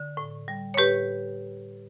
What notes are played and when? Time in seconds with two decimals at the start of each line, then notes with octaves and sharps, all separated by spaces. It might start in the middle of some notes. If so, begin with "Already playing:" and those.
Already playing: D3
0.17 A2
0.48 G3
0.74 C#5
0.77 A2 G4 B4